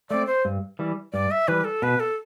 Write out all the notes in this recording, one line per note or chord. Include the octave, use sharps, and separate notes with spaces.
A3 C4 D5
C5
G2
E3 G3
G2 D5
E5
E3 G3 B4
A4
B2 B4
A4